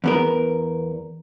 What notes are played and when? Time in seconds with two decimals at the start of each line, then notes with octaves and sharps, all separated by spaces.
0.04 E2 B3 A#4